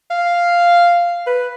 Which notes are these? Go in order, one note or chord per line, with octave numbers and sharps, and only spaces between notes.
F5
B4